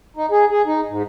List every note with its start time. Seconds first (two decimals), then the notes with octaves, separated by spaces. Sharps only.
0.16 D#4
0.31 G#4
0.51 G#4
0.66 D#4
0.89 G#2